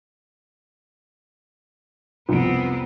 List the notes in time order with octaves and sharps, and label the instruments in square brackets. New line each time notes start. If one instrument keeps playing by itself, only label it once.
[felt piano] C2 F2 D7 [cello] B3 C4